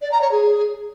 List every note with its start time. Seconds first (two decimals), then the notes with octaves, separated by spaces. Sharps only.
0.02 D5
0.12 A#5
0.21 C#5
0.31 G#4